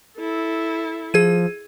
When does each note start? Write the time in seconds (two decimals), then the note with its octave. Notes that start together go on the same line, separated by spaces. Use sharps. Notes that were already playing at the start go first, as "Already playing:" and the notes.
0.17 E4 A4
1.14 F3 G#4 G#6 D#7